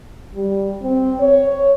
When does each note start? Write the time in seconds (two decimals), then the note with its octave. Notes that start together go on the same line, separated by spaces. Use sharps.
0.35 G3
0.82 C4
1.20 C#5